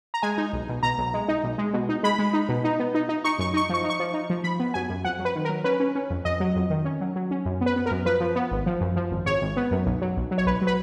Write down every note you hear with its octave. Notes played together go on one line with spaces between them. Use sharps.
A#5
G#3 G#5
D#4
B1
B2
B2 A#5
B1
G#3
D#4
B1
G#3
B2
D#4
G#3 B5
G#3
D#4
B2
D#4
B3
D#4
D#4
D#4 C#6
F#2 C#6
D#4 C#6
F3 C#6
D#4
C#6
F3
D#4
F3
F3 B5
B3
F#2 G#5
F#2
F2 F#5
F#3
B4
D#3
A#4
F#3
C#4 B4
C#4
C#4
F2
F2 D#5
F#3
F2
D#3
C#4
F#3
F#3
C#4
F#2
B3
B4
B3
A#4
F#2
F3 B4
F3
B3
G#1
F3
F#2
F3
G#1
G#1 C#5
G#1
B3
F#2
B1
F#3
B1
F#3
C#5
B1 B4
F#3
B4